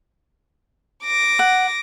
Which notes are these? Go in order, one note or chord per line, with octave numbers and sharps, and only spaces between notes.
D6 A#6
F#5